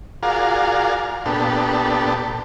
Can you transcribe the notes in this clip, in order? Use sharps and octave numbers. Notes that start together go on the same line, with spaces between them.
F4 F#4 G#4 A#4 D5 F5
A#2 B3 D4 G4 A4